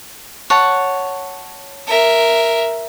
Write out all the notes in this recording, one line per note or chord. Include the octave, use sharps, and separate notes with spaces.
C#5 F#5 A5
A#4 E5